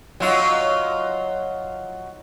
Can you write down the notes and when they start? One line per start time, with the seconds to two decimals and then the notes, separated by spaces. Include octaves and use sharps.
0.20 F#3 D#4 F4